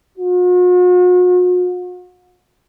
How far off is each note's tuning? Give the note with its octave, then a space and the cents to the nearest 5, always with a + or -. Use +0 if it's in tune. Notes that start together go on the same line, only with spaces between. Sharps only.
F#4 -45